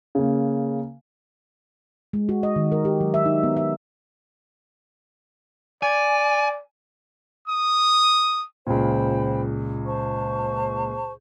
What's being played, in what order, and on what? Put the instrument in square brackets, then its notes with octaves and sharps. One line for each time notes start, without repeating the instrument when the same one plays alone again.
[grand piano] C#3 A#3
[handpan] G#3
F#4
D#5
D#3
A#4
G4
F#3
E5
D#4
B3
E5
[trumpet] D5 [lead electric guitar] G#5
[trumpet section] D#6
[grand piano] C#2 A#2 [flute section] C5 G5 B5
[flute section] C5 A5 C#6